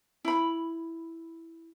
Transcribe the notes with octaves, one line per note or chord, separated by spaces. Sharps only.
E4 B5